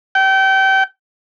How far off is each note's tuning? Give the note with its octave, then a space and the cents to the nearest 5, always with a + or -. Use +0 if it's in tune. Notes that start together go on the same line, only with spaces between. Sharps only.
G5 -30